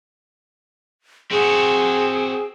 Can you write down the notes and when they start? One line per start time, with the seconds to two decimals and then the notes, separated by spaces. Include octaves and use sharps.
1.31 C4 F#4 G#4